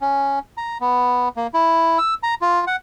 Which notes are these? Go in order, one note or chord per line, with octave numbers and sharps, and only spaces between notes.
C#4
A#5
B3
A#3
E4
E6
A#5
F4
F#5